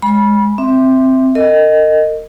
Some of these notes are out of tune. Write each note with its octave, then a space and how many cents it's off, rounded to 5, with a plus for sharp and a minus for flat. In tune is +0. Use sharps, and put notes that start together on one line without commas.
G#3 +0 B5 -25
C4 +0 E5 +0
A#4 -40 D#5 -5